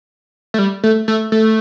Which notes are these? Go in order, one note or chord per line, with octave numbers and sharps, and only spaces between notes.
A3
G3
A3
A3
A3